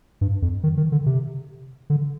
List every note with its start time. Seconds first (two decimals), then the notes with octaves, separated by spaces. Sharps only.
0.21 G2
0.42 F2
0.63 D#3
0.77 D#3
0.92 D3
1.06 C3
1.90 D3